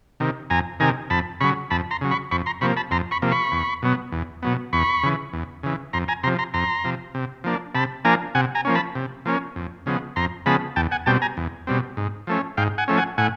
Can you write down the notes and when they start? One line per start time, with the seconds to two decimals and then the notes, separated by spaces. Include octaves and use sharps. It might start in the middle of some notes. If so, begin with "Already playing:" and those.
0.20 C3 D#3
0.50 F2 G#5 A#5
0.80 C3 D#3 G#5 A#5
1.10 F2 A5 B5
1.41 C#3 F#3 B5 C#6
1.71 F2 A5 B5
1.91 A#5 C6
2.01 C#3 F#3
2.11 B5 C#6
2.31 F2 B5 C#6
2.46 A#5 C6
2.61 C3 F3 A#3 B5 C#6
2.77 A5 B5
2.91 F2 A#5 C6
3.11 B5 C#6
3.22 C3 F3 A#3
3.31 B5 C#6
3.52 E2
3.82 B2 F#3 B3
4.12 E2
4.43 B2 F#3 B3
4.73 E2 B5 C#6
5.03 C#3 E3
5.33 E2
5.63 C#3 E3
5.93 F2 A#5 C6
6.08 G#5 A#5
6.23 C3 A#5 C6
6.27 F3
6.39 A#5 C6
6.54 F2 A#5 C6
6.84 C3 F3
7.15 C3
7.44 F3 A#3 D4
7.75 C3 A5 B5
8.05 F3 A#3 D4 G#5 A#5
8.35 C3 F#5 G#5
8.55 G#5 A#5
8.65 F3 A#3 C#4
8.75 A5 B5
8.95 C3
9.25 F3 A#3 C#4
9.56 F2
9.86 C#3 F3 G#3 B3
10.16 F2 A#5 C6
10.46 C#3 F3 G#3 B3 A5 B5
10.76 E2 G5 A5
10.92 F#5 G#5
11.06 B2 G3 C4 G5 A5
11.22 G#5 A#5
11.37 E2
11.67 B2 G3 C4
11.97 G#2
12.27 F3 A3 C#4
12.57 G#2 F5 G5
12.78 F#5 G#5
12.88 F3 A3 C#4
12.98 F#5 G#5
13.18 A2 F#5 G#5